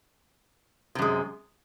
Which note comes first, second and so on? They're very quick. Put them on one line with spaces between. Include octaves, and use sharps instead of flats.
C3 F#2 G#3